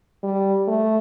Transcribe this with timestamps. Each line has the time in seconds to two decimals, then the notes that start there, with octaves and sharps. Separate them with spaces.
0.23 G3
0.68 A3